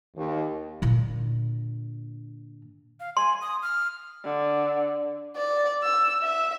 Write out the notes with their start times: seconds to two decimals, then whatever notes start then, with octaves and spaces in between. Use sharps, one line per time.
0.16 D#2
0.82 A#2 D3
3.00 F5
3.17 G#5 C6
3.41 D#6
3.62 F6
4.24 D3
5.36 D5
5.83 E6
6.23 E5